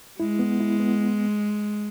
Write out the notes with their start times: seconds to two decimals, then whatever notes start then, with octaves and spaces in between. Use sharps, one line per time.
0.19 G#3 E4
0.39 B3
0.60 E4
0.80 B3